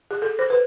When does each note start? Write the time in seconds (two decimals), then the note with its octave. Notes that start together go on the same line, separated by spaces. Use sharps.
0.11 G#4
0.22 A4
0.39 C5
0.50 B4